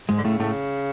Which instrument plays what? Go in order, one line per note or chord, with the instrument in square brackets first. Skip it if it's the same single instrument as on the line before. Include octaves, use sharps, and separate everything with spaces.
[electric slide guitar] G#2 G#3
[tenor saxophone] D3
[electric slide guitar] A2 A3 [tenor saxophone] C#3
[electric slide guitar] A2 A3